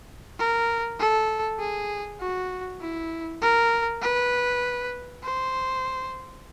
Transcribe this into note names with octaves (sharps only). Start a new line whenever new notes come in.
A#4
A4
G#4
F#4
E4
A#4
B4
C5